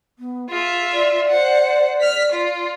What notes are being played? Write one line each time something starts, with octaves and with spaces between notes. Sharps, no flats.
B3
F4 G#4 E5
D5
C5 F#5
F6 B6
F4